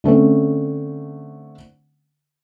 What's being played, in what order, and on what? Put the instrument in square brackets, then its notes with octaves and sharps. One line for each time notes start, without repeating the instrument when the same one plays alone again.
[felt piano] D3 A3 C4 C#4